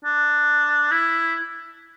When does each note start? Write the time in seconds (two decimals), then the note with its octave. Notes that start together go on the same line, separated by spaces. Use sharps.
0.05 D4
0.91 E4